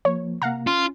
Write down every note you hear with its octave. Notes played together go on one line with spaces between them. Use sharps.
F3 A#3 C#5
C3 A#3 F5 F#5 A#5
C#4 F4